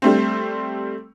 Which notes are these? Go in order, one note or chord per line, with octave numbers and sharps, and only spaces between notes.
G3 A3 C4